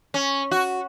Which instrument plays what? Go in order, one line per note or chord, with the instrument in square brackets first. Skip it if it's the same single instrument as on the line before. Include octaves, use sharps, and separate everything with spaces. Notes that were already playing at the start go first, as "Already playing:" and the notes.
[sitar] C#4
F#4